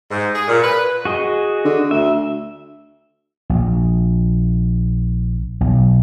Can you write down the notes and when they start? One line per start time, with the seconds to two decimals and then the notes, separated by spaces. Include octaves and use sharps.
0.10 G#2
0.35 G#4
0.48 A#2
0.62 B4
1.05 F#4 G#4 D#5
1.65 D3
1.91 D2 E5
3.50 A#1
5.61 B1